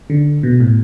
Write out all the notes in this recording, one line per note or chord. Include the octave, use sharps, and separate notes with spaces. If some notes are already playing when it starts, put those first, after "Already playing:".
D3
B2
A2